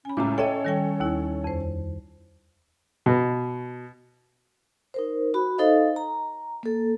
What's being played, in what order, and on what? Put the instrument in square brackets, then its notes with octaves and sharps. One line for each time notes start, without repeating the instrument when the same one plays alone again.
[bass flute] C#4 [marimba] G#5 B5
[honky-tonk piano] C#2 A2 [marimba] A#5 D6
[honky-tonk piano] A4 C#5 [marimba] D#5 E5 G5
[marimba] D#3 G3 G5
D#2 E4
F2 C5
[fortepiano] B2
[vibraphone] D#4 A#4 C5
F#4 B5
D#4 A4 C5 D#5 F5
A#5
A#3 A4